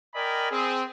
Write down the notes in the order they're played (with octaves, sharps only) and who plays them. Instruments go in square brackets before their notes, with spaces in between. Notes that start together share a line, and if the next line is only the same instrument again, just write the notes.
[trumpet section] A#4 D5 D#5 G5 G#5 B5
C4 G#4